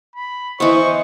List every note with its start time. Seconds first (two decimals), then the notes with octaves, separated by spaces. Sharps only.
0.16 B5
0.60 E3 B3 C5 D#5 C#6